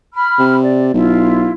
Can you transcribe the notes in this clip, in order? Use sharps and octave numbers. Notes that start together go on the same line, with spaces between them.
B5 F6
C3
D5
B1 E4 F4